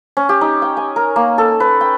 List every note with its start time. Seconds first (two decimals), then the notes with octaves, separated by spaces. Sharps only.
0.17 C#4
0.29 G4
0.41 D#4
0.62 G5
0.77 G#5
0.96 A#4
1.16 A#3
1.38 A4
1.60 B4
1.81 G5